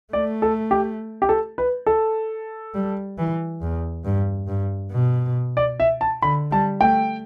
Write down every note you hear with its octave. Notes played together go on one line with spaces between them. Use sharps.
A3 D5
A4
G4
G4
A4
B4
A4
G3
E3
E2
G2
G2
B2
D5
E5
A5
D3 B5
G3 A5
A3 G5